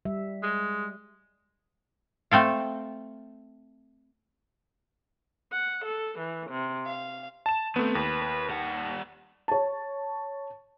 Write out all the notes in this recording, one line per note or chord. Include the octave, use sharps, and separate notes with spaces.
G3 E5
G#3
A3 C4 A4 F5
F#5
A4
E3
C3
F5
A5 E7
D#3 A3 B3 C4
D#2 B4
B4
G3 F#5
C#5 A5